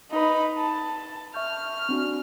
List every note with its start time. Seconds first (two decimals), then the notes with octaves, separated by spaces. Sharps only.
0.11 D#4 B4
0.58 A5
1.34 E5 C#6 F6 G6
1.89 C4 D4 F#4